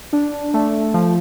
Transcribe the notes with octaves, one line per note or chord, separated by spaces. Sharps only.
D4
A3
F3